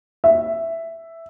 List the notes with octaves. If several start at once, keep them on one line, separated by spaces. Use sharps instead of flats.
E5